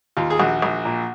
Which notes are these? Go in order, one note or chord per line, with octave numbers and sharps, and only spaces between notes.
D#2 F4
G#4
A#1 F#4
A#1
A#2